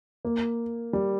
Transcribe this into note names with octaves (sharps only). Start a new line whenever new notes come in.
A#3
G3